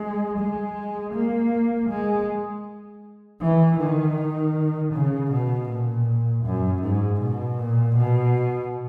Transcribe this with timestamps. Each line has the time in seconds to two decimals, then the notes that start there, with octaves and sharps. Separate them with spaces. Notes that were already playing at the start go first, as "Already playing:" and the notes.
Already playing: G#3
0.39 G#3
1.14 A#3
1.90 G#3
3.41 E3
3.80 D#3
4.94 C#3
5.31 B2
5.69 A#2
6.44 F#2
6.83 G#2
7.21 B2
7.58 A#2
7.97 B2